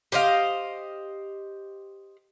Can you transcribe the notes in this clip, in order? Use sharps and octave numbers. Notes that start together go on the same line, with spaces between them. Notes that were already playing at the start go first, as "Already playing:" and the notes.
G4 C5 D#5 F5